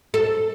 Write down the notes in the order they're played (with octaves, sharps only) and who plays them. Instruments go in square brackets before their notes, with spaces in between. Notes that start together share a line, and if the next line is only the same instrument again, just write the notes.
[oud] A4